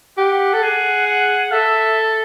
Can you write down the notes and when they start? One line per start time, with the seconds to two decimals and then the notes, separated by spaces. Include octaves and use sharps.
0.17 G4 F#5
0.53 A4
0.63 G#4 F#5
1.07 F#5
1.51 A4 E5